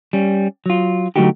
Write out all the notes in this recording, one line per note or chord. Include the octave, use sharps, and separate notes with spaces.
G3 C#4
F#3 F4
D3 F#3 A3 D#4 F#4 G4